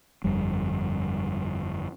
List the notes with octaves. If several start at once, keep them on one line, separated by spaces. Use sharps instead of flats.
G1 F2 G3